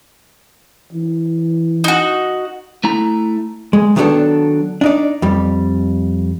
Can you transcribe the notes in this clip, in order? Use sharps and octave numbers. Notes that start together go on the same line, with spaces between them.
E3
D#4 F#4
A3 E4 A#5
G#3
D#3 F#3 B3 C#4 D4 A4
D4 D#4 D5
F2 G3